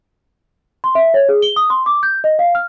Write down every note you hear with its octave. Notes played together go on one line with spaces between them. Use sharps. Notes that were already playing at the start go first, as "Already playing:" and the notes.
C6
E5
C#5
G#4
G7
D#6
C6
D6
G6
D#5
F5
F6